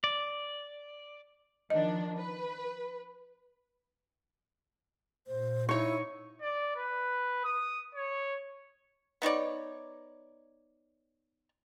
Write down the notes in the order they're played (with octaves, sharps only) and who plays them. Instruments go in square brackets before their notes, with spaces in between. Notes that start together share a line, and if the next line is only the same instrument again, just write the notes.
[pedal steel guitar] D5
[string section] D#3 F3 D4 [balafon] D#5
[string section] B4
[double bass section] A#2 [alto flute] C5
[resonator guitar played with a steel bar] D#4 C#5 [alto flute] E4 [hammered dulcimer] C#6
[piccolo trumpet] D5
B4
D#6
C#5
[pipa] B3 D#4 C#5 D5